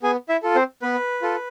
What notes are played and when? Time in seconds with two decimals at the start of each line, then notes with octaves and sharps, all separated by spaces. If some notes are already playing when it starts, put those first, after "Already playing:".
0.03 B3 G#4 G#5
0.29 E4 E5
0.43 F4 A4
0.55 C4 C5
0.82 B3 B4
1.22 F4 A4